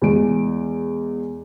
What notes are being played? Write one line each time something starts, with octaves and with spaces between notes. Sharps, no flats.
E2 G#3 D7